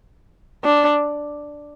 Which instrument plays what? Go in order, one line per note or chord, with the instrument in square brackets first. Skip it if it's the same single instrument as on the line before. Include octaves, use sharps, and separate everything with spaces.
[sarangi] D4